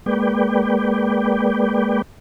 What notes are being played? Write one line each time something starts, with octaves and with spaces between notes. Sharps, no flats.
G#3 A#3 B4 D5 G5